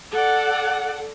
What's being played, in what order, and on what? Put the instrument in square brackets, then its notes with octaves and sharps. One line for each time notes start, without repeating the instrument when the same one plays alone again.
[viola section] A4 D5 [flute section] F#5